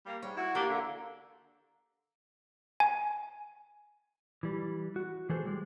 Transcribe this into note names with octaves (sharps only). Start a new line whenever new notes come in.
G3 A#3
G#2 G3 C#5
E4 F#4
A#3 D4 G4
D3
G#5
E3 G3
F#4
E3 F#4 G#4 A4 C5
G3 G#3